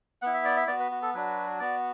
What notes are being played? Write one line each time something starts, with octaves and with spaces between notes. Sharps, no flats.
B3 E4 F#5
E5
D5
E5
B3 F#4 D5
B4
F#4
A4
F#3 D4 F#4 B4
B3 F#4 D5